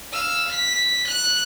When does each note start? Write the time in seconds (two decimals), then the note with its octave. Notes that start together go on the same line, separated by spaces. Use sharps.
0.12 F5 E6
0.52 B6
1.08 F#6